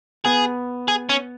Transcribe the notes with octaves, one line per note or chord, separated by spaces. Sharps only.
B3 G#4
G#4
C#4